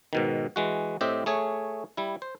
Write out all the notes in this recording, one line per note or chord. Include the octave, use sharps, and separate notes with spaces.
G#2 B2 D#3
E3 G#3 F#4
A2 C4 G4 D#5 E5
A3 G#4 C#5
G3 E4
C5